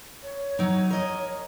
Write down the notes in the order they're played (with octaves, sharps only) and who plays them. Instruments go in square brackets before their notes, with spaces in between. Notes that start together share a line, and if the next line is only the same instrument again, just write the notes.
[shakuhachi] C#5
[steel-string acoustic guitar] F#3 D#4
A#4 D#5